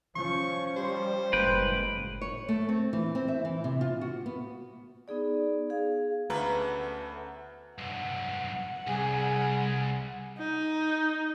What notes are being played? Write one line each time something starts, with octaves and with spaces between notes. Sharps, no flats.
F3 C#4 C#6
G3 C5
F#1 A2 G#3 A#3 B4 G5
C#5
A3
C4
E3
C4
E5
E3
C3
F4
F#4
B3
B3 D#4 G#4 D5
G#4 F5
D2 B3 C#4 A4 B4 E5 A#5
B1 G2 F#5
C2 G3 G#4
D#4